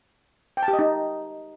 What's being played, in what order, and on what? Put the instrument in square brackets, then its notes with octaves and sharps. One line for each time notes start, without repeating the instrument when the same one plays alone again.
[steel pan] G5
A5
G4
D#5
D#4